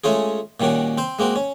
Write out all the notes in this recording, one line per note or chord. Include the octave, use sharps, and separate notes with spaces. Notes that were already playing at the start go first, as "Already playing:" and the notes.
G#3 A3 C#4 F4 G#4
A#2 D#3 G3 C#4 F#4
C4 C5
G#3 A#3 C4 F#4
C#4